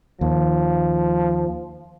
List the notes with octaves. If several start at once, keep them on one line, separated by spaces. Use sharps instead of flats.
D#2 F3